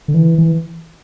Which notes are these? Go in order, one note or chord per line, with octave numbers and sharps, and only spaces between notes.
D3
E3
E3